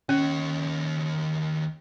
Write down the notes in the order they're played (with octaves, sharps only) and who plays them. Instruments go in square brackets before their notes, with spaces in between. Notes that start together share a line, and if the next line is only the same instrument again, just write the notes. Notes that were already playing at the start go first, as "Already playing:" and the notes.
[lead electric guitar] D#2 C#5 [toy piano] C#4